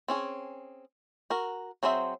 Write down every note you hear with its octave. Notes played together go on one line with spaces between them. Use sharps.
C4 C#4 G#4
F#4 A#4
F#3 C4 G#4 C5 E5